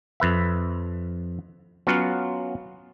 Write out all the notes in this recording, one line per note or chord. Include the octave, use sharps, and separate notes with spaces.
F2 B4 E5
F#3 B3 C#4 F4 F5 F#5